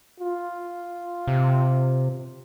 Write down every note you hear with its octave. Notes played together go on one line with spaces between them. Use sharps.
F4
C3